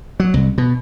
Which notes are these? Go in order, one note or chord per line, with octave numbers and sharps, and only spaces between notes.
F#3
C2
B2